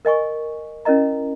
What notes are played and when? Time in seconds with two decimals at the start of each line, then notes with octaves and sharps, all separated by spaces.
0.05 A#4 D#5 G#5 C#6
0.85 C#4 E4 A#4 D#5 A#5